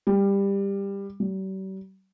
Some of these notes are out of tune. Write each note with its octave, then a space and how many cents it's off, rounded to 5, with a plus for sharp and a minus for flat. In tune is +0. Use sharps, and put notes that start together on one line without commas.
G3 +15
G3 -45